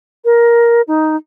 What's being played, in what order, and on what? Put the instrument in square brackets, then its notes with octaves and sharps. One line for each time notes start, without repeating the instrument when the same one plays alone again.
[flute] A#4
D#4